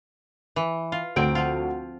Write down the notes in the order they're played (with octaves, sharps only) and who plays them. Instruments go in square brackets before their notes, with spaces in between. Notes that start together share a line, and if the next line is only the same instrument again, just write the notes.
[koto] E3
F4
[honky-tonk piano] D2 D7 [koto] C4
[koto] F3 F4